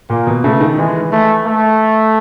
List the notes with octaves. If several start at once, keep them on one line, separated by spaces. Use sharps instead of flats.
A#2 A#3
B2
C#3 A3
D#3
E3 G#3
A3
A3